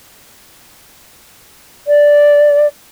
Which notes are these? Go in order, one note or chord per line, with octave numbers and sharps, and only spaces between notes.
D5